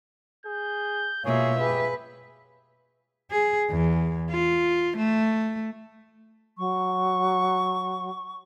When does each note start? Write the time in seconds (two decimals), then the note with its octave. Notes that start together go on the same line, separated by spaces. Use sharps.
0.46 G#4 G6
1.25 B2 A#3 F4 G#4 C#5 E5
1.60 G4 G#4 B4
3.31 G#4
3.70 E2
4.31 F4
4.97 A3
6.58 F#3 C#6